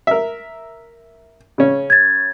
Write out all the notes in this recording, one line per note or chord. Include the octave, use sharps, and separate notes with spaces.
A#4 E5
C#3 C#4
G#6 A6